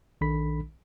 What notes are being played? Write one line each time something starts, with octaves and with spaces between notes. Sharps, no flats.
A#1 D#3 D4 A4 B5 B6